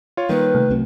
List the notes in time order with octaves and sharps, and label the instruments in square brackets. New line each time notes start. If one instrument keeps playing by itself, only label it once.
[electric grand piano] F4 C#5
[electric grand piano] D#3 [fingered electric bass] G3 A#3 [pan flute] B4
[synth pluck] C3 A3
[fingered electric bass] C2 F#3 C4